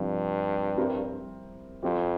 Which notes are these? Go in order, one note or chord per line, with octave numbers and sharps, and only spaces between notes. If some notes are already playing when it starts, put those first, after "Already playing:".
Already playing: G2 C3 F3 C4 E4
G3 C4 E4 A#4
F2 F3 C4 G4 C5